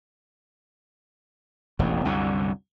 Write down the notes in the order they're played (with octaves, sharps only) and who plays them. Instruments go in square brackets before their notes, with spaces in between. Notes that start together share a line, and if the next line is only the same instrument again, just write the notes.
[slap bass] E1 A1 D#2
C2 F#2 D3